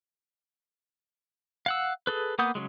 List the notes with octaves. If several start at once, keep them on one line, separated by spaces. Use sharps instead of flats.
F5 F#5 E6
G#4 A4 B4
A#3 B3 F#5 D#6 G6
C#3 F3 F#3 G#3